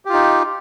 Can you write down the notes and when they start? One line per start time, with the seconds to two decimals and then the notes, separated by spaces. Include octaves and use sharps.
0.05 G4
0.09 F4
0.13 D#4